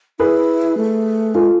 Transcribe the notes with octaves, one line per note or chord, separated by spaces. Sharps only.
E4 G#4 B4
A3
G#3 F4 A4